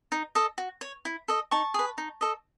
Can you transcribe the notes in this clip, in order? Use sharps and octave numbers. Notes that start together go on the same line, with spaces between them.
D#4
A4 D#5
F#4
C#5
E4
A4 D#5
D#4 A5 C#6
G#4 B4
D#4
A4 D#5